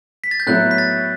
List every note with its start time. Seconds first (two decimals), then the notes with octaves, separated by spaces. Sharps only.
0.24 B6
0.31 A6
0.40 G6
0.47 A2 F#3 B3 E4 F#6
0.71 B6
0.78 A6